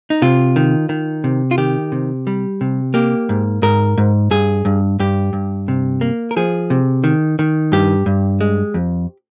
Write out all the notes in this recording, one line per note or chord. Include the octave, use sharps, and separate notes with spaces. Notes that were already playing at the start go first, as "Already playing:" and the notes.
D#4
C3 F4
D#3
D#3
C3
F4
D#3 G4
C3
G3
C3
A#3 G4
G#2
G#2 A#4
G#2
G2 G#4
G2
G2 G4
G2
C3
A#3
A#4
F3 G#4
C3
D#3
D#3
G2 G4
G2
G#3
F2